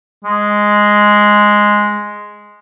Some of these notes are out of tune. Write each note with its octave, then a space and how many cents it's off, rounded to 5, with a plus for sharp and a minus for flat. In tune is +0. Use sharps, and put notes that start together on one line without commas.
G#3 +0